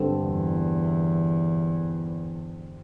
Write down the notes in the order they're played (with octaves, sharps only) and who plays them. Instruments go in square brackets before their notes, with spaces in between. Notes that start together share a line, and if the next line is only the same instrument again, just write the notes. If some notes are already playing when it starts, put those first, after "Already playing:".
Already playing: [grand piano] G2 D3 C4 A4
[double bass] E2